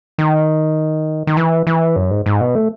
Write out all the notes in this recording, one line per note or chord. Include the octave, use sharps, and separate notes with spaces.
D#3
D#3
E3
E3
F#2
G#2
G#2
B2
A3